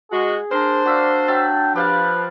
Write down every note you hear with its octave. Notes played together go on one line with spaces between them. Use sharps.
G#3 F#4 G#4
D4 A#4 C5
F#4 D5 E5 F5
F#3 E5 G5 A5
F3 G4 B4 F5 A5